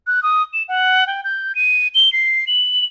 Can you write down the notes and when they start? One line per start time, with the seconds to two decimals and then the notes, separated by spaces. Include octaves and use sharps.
0.07 F#6
0.23 D#6
0.53 E7
0.69 F#5
1.07 G5
1.24 G6
1.55 D#7
1.95 G7
2.13 C7
2.47 F#7